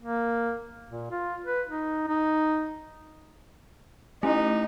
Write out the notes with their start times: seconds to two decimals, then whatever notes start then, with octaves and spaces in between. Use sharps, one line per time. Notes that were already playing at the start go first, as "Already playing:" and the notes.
0.02 A#3
0.89 A#2
1.11 F4
1.45 B4
1.69 D#4
2.08 D#4
4.23 A3 C#4 D#4 E4